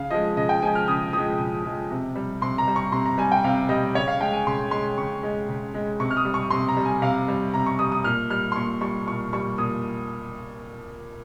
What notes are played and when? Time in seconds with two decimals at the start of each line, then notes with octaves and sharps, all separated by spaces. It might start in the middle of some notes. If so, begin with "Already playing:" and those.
Already playing: C#3 F5
0.10 F3 G#3 D#5
0.36 C#3 D#5
0.49 G5
0.62 F3 G#3 G#5
0.75 F6
0.88 C#3 D#6
1.13 F3 G#3 D#6
1.39 C#3
1.65 F3 G#3
1.90 C3
2.16 G3
2.41 C3 C6
2.58 A#5
2.68 G3
2.76 C#6
2.92 C3 C6
3.06 A#5
3.18 G3 G#5
3.32 G5
3.44 C3 F5
3.69 G3 D#5
3.95 C#3 C#5
4.08 F5
4.20 G#3 G5
4.33 G#5
4.47 C#3 C6
4.71 G#3 C6
4.97 C#3 C#6
5.23 G#3
5.48 C#3
5.74 G#3
5.99 C3 C#6
6.10 F6
6.17 D#6
6.25 G3
6.34 C#6
6.50 C3 C6
6.68 A#5
6.77 G3
6.85 G#5
7.02 C3 F5
7.28 G3
7.54 C3 A#5
7.66 C#6
7.79 G3 D#6
7.92 D#6
8.04 A#2 F6
8.30 G3 F6
8.52 C6
8.55 A#2 C#6
8.81 G3 C#6
9.07 A#2 C#6
9.33 G3 C#6
9.58 A#2 D#6